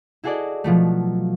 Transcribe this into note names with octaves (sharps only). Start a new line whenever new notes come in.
E4 F#4 G#4 A4 D5 D#5
B2 F3 F#3 A3